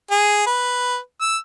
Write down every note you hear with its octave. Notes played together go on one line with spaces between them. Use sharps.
G#4
B4
E6